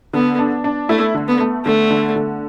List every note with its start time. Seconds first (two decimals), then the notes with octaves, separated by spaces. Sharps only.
0.13 D3 B3
0.39 D4
0.64 D4
0.89 A3 E4
1.14 D3
1.28 B3
1.40 A3
1.65 D3 A3
1.91 D3
2.16 D3